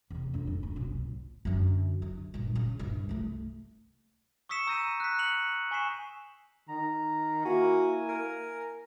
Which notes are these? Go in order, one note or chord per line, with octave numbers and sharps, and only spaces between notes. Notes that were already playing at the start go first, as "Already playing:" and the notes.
E2 C3
F2 D4
G#2
D1
F#1 B1
C#2 A#2
F#2 D3
D3
G2 A#2
C#3
C2 G2
C2 A3
C#6 D#6 E6 B6 C#7 E7
A#5 E6 G6 A#6 D#7
F#6 B6
C#7 F7 F#7
G#5 C#6 B6 C7 E7
D#3 A#5
A#3 E4 F#4 G#5
A#4